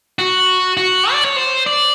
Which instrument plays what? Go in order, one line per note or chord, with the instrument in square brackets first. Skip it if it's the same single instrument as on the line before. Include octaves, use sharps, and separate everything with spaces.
[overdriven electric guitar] F#4
F#4
D5
C#5
C5
D5